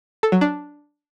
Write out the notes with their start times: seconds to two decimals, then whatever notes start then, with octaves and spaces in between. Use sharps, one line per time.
0.23 A4
0.32 F#3
0.41 D4